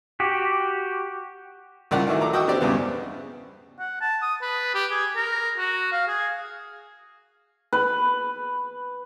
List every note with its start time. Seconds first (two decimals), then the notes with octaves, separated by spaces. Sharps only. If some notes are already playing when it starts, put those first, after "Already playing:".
0.20 F#4 G4
1.91 C2 C#3 F4 A#4 D5 F#5
2.07 D#3 E3 F#3 A3 E4
2.21 A4 A#5 D6
2.33 F#4 D#5 E5 G5 D6 E6
2.47 B3 C4 D4 G4 D5
2.61 E2 G2 C#3 B3
3.79 F#5
4.01 A5
4.22 D#6
4.42 B4
4.74 G4
4.91 G#4
5.16 A#4
5.58 F#4
5.92 F5
6.08 G#4
7.73 B4